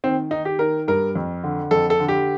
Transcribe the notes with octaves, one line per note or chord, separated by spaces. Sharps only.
D#3 C4
D#3 D#4
G4
D#3 A#4
G2 A#4
F2
D3
F2 A4
A4
D3
G4